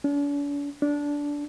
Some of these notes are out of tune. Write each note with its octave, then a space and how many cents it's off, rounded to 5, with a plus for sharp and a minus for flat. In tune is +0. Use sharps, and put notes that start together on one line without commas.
D4 -45
D4 -15